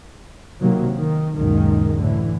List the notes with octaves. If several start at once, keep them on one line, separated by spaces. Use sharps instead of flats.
C3 D#3 F#3 A#3
D#3
C#2 F#2 A#2 D#3 G#3
A2 D3 E3